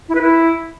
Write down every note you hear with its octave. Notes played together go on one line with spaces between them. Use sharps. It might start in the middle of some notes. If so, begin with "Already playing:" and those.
E4
B4
E4